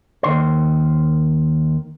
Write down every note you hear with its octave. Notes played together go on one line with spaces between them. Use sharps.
D#2 D#3 C5